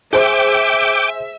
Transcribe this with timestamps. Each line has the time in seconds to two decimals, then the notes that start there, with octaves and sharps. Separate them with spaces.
0.13 G#4 C5 E5 G5 D6